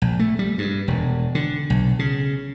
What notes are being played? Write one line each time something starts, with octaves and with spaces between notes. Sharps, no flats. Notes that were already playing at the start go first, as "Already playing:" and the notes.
A#1
A3
G3
G2
E1
D3
B1
C#3